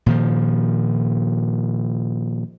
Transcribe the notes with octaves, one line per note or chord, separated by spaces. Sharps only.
A#2 D#3 F3